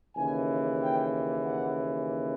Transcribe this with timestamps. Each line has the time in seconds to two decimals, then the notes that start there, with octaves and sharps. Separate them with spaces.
0.15 D#2 C#3 E3 G#5
0.80 G5
1.45 F#5